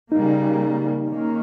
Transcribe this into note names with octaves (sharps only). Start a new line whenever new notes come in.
C#3 G3 A#3 D#4
D#3 A#3 C#4